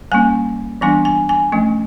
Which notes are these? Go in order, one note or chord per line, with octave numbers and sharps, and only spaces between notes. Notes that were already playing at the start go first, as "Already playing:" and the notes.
G3 A#3 C#4 G#5
E3 G3 B3 D4 G#5
G#5
G#5
F3 A3 C#4